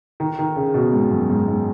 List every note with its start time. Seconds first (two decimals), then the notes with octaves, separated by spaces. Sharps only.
0.20 D#3
0.39 D#3
0.56 C#3
0.74 B2
0.93 G#2
1.11 F#2
1.30 G#2
1.48 G#2